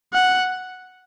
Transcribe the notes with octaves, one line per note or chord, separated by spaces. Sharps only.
F#5